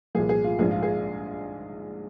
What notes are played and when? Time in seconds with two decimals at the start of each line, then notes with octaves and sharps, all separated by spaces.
0.15 C2 A#2 F3 G#4
0.29 G#4
0.44 F4
0.59 A#1 G#2 F3 G#4
0.71 F4
0.83 G#4